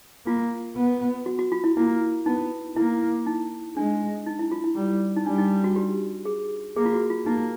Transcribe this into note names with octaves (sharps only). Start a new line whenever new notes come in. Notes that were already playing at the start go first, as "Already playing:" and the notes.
A#3 F4
B3
F#4
F#4
F4
E4
A#3 E4
B3 D#4
A#3 E4
D#4
G#3 D4
D#4
E4
F4
E4
G3
D#4
G3 D4
D#4
F#4
G4
G#4
A#3 G#4
F4
F#4
F4
A#3 D#4